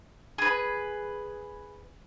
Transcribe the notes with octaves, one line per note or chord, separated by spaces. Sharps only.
G#4 B4